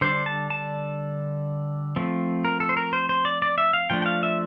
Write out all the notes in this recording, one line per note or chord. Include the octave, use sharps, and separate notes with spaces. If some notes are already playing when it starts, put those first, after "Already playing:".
D3 G3 D4 C5
A5
A5
F3 A3 C4
A#4
A4
C5
A#4
C5
C5
D5
D5
E5
F5
F3 A3 D4 G5
G5
F5
E5